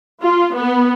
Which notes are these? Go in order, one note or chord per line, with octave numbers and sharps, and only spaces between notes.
F4
B3